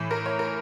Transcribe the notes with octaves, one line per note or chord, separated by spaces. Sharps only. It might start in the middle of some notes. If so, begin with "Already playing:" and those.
Already playing: A2 E3
A#4
C#5
A#4